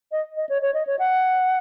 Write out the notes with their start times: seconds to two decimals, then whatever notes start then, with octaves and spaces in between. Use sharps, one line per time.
0.12 D#5
0.37 D#5
0.49 C#5
0.62 C#5
0.74 D#5
0.87 C#5
0.99 F#5